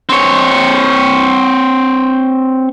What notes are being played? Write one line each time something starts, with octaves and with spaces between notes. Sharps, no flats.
C4 C#5